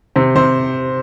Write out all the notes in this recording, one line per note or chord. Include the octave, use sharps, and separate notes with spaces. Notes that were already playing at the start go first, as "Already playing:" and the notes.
C3 C5
C3 C5